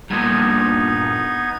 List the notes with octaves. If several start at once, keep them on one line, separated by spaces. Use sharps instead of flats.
G2 A#2 B3 D#4 G#6